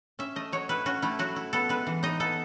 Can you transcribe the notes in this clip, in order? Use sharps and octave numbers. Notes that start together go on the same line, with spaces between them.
C#4 E5
A3 D#5
F#3 C#5
E4 B4
C#4 F#4
A3 E4
F#3 F#4
E4
B3 A4
G#3 B4
E3
D#4 D#5
B3 A4